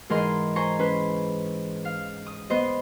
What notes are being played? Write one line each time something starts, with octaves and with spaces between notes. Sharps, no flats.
G#2 E3 G#4 A#4 D#5 C6
C5 G#5 A#5 C#6
C#4 B4 C5
F5
D#6
B3 C5 D#5